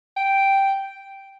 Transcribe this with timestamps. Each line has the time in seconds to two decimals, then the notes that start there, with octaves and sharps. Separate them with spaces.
0.17 G5